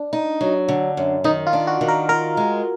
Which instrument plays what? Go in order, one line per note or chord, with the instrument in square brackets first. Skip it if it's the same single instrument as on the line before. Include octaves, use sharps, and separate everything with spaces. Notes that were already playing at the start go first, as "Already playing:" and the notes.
Already playing: [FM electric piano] D4
[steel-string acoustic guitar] D#4
F#3
D3
F#2
[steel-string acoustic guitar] D#3 [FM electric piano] D#4
[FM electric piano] F4
[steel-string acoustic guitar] D4
[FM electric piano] F#4
[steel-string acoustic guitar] D#3
[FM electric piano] A#4
[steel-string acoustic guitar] F4 [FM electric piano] A#4
[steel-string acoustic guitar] G#3